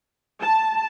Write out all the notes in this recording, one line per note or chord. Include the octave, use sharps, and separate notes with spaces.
A5